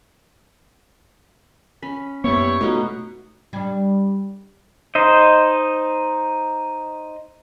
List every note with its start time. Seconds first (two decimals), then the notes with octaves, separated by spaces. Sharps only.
1.82 C#4 B5
2.24 F#2 G3 A#3 B3 E4 C#5
2.61 B2 A3 D#4 F#4
3.53 G3 D4
4.95 D#4 C5 D#5